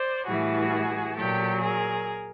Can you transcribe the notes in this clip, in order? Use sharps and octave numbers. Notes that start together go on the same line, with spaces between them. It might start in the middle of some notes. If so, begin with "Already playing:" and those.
Already playing: C5 D5
A2 E3 G3 F#4 G#4
A#2 F#3 G4 A4
G#4 A#4